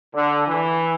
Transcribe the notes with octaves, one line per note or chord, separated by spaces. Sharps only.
D3
E3